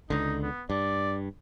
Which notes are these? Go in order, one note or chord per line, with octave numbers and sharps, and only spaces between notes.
C#2 D3 D#4
B3
G2 D5